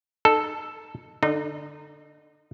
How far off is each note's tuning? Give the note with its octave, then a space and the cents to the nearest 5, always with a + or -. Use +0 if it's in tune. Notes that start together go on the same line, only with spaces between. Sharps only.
D#4 -25 A4 +0
D3 +5 D#4 -25